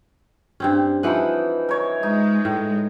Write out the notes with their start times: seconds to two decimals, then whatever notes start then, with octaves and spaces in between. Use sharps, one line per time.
0.60 G2 C4 C#4
1.03 E3 F3 D#4 B4 F#5 B5
1.69 A#4 C#5
2.03 G#3 D#4
2.45 A2